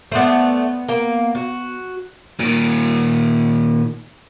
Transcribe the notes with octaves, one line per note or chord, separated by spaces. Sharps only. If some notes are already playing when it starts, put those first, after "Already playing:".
A3 B3 C5 D5
A#3
F#4
A#2 D#3